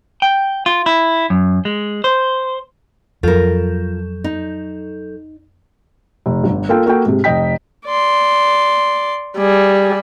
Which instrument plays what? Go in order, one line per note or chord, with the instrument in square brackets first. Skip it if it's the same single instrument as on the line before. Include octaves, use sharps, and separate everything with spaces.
[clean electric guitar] G5
F4
E4
F#2
G#3
C5
[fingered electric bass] F2 [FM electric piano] F#3 A4 G6 [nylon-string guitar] F4 A#4
[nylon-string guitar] D#4
[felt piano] F1
G1
A#3 F4 A4 G5
A#3 F#4 A4 G5
G#2 C3
F1 D#5 G5 B6
[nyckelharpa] D5 C6
[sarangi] G3 [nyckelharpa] G#4